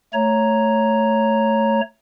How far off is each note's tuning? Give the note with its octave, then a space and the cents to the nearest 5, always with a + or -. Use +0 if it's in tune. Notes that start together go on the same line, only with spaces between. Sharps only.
A3 +0 C#5 +0 A#5 +0